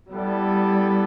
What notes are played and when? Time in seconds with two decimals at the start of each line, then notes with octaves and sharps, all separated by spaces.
0.12 G3 B3 E4 A4 D5